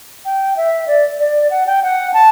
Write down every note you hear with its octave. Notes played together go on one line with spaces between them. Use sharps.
G5
E5
D5
D5
F#5
G5
F#5
A5